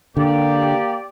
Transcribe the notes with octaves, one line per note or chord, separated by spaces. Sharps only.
D3 A#3 G4 D5